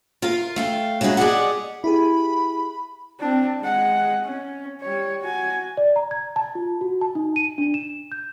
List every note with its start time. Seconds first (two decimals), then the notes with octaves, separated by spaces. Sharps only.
0.22 F4 A#4 F5
0.56 A3 F5 G5
1.01 F#3 G#3 C#4 E4 F#4 G#4
1.17 G4 G#4 C5 D5 D#5 F#5
1.84 E4 G4 G#4 B5
3.20 C4 D4
3.61 G#3 F#5
4.24 C#4
4.81 G3 C#5
5.22 F#4 G#5
5.77 D5
5.96 A#5
6.11 G#6
6.36 A5
6.55 F4
6.81 F#4
7.01 A5
7.15 D#4
7.36 D#7
7.58 D4
7.74 E7
8.12 G6